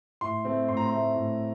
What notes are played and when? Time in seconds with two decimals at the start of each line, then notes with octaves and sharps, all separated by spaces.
0.21 A2 C6
0.45 A3 C4
0.69 A2 C6
0.77 A#5
0.86 C6
0.92 A3 C4
1.15 A2